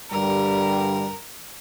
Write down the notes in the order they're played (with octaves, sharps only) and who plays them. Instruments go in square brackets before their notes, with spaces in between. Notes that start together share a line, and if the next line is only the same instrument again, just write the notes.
[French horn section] G2 D3 G3 [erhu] A#4